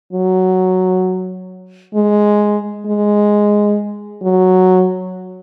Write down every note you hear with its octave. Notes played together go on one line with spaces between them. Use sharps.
F#3
G#3
G#3
F#3